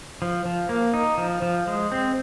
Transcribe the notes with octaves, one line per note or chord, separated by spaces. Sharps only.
F3
F3
A#3
D#4
F3
F3
G#3
C4